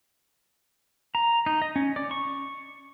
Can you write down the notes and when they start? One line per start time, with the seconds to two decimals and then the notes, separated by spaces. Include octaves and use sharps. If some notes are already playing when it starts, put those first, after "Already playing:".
1.15 A#5
1.46 D#4
1.62 D#5
1.76 C#4
1.96 D5
2.11 C#6